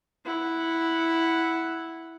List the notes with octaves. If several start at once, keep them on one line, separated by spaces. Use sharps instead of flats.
E4 F#5